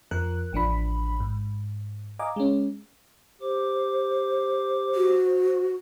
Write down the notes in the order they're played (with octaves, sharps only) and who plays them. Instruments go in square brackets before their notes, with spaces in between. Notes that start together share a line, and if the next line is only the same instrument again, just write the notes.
[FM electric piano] F2 F3 A#4 F#6
A1 F3 D4 B5
G#2
D#5 F5 G#5 A#5 D6
G#3 C#4
[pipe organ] G4 D6 [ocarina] C5
[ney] F#4